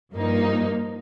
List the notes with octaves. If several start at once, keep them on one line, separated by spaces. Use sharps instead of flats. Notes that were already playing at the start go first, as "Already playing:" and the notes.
G2 F3 A#3 D#4